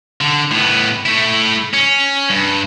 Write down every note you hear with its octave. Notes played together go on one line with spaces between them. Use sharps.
D3
A2 B3
A3 E4
C#4
G2